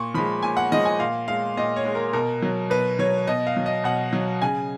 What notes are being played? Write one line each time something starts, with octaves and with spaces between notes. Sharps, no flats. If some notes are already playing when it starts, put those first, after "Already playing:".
Already playing: A#2 C#6
F3 G#3 B5
A#2 G#5
F#5
F3 G#3 D#5
G#5
A#2 F5
G#3 F5
A#2 D#5
C#5
G#3
A#4
B2 A#4
F#3
B2 B4
F#3 C#5
B2 D#5
F5
F#3
D#5
B2 F#5
F#3
C#3 G#5